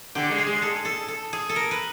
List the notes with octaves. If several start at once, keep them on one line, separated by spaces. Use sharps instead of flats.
D3 G4
G#3
G#4
G#3
A4
G#4
A4
A4
G#4
A4
A#4
B4